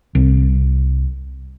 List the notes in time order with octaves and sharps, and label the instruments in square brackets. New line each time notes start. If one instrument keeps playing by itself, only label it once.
[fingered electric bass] C2